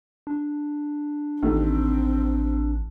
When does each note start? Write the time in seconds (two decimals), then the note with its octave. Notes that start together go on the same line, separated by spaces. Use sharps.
0.27 D4
1.43 A1 D#2 C4 D#4 A4